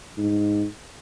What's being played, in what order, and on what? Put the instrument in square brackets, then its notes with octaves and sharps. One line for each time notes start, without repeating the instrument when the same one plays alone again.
[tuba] G#2